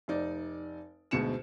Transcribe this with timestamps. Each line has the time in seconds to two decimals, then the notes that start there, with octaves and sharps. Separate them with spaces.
0.08 F1 D#4 D5
1.11 D2 G#2 B2 C#7 E7